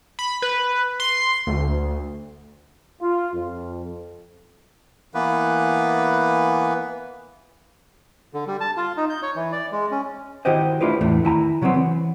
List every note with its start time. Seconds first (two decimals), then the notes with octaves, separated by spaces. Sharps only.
0.19 B5
0.42 B4
1.00 C6
1.47 D2
3.01 F4
3.34 F2
5.14 E3 A#3 B3 B4
8.34 D3
8.47 G3
8.61 A5
8.77 F4
8.97 D#4
9.10 G6
9.23 C#5
9.36 E3
9.52 D5
9.72 G#3
9.91 C#4
10.45 D#3 E4 F#4 G4 C5 D#5
10.81 A3 D4 E4 F4 G4 B4
11.01 E2 A2 E3 A3
11.24 D#3 E4 G#5 A#5
11.62 C#3 F#3 G3 B3 C4
11.74 E3